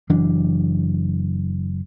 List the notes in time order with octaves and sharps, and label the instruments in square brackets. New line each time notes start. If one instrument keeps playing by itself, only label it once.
[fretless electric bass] F#1 E3 F#3 D4